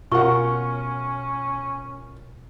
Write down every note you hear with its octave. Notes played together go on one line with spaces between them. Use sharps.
B2 C#4 F4 A#4 F#5 C#6